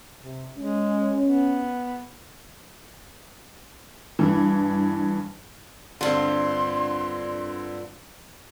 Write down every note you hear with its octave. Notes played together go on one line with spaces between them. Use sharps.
C3
G#3 C#4
B3
G2 E3
G2 D3 C4 F4 C6